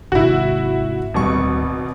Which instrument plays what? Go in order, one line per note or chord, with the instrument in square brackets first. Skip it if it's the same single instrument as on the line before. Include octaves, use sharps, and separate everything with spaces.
[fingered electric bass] G#1 G#2 C3 [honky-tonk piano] E4 F#4
[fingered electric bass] D1 G3 D4 [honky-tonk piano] G#1 B2 C#6